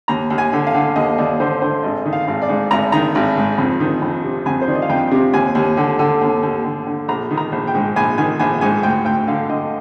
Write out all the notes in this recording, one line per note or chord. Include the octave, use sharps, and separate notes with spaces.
D#2 A#5
D#2
G#5
D3
F5
D3
D#2 D#5
D#2 D5
D3 C5
D3 C5
G#1 D#5
D#3
F5
G#1
D5
G#2
G#1 A#5
D#3 A#5
G#1
G#2
F2
D#3
F2
C3
F2 G#5
C5
D#3 D5
D#5
F5
F2 G5
C3
D#2 G#5
D#2
D3
D3
D#2
D#2
D3
D3
A#1 A#5
D#3
A#5
A#1
G5
G#2
A#1 G#5
D#3 G#5
A#1 G#5
G#2 G#5
D2 G5
D2 G5
D3 F5
D3 D#5